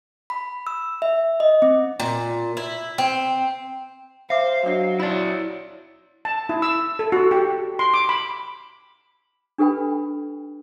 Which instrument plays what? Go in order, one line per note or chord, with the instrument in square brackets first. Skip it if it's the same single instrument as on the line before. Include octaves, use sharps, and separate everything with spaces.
[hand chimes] B5
E6
E5
D#5
C4
[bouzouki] A#2
E4
C4
[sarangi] C5 [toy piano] E5 D6 [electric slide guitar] F5
[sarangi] F#3 [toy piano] D4 F#4 D#5
[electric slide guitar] E4 D5 [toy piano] A5 B5
[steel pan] A5
E4
E6
A4
F#4
G4
C6
D6
B5
[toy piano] D4 G4 A4 B4 G5 B5